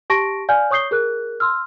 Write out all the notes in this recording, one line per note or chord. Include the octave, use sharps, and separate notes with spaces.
G4 A5 C#6 A#6 D7
D5 F5 G#5 F6 G6
C#5 C#6 D#6 G6 C7 G7
G#4 A#4 F#6
C6 E6 F6